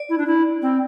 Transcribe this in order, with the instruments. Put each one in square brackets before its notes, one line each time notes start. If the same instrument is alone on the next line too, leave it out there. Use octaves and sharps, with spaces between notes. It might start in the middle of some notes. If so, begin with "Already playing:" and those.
Already playing: [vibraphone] D5
[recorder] E4
D4
E4
C4